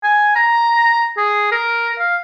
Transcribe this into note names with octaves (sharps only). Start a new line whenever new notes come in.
G#5
A#5
G#4
A#4
F5